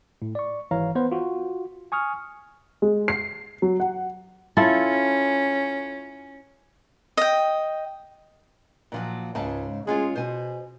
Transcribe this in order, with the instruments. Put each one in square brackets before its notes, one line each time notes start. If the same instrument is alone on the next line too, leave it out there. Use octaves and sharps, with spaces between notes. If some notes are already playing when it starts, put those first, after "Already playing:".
[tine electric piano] A2
D5 C#6
G#1 E3 C#5 F5 A#5
B3 B4 C5
F4 F#4
G#5 C#6 D#6 F6
[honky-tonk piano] G#3
C7
F#3
F#5
[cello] C#4 [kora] E4 F4 A4
[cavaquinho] D#5 G5
[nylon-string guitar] A#2 F3 F#3
[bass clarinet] C#2 [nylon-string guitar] G#2 C#3 A5
[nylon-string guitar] G#3 C#4 F4 [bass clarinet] G#4
[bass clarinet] B2 [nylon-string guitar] C5 G#5